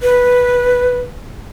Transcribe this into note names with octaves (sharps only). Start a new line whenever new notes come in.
B4